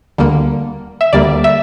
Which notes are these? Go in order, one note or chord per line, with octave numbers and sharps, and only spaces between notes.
D2 D3 G3 A#3
E5
D2 D3 G3 A#3 D5
E5